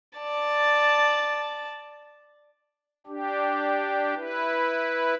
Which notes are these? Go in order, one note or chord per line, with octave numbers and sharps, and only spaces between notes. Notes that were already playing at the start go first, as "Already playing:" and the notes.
D5 A5
D4 G4
E4 B4